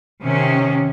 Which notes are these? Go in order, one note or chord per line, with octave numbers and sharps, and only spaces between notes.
C3 D#3 C#4